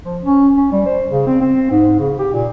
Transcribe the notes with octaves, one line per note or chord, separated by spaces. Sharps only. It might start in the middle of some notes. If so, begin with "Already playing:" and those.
F3
C#4
C#4
G3
C5
C#3
C4
C4
G#2
C#3
G4
A#2